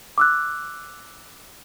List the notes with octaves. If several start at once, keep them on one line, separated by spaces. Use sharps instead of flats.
D6 E6 F#6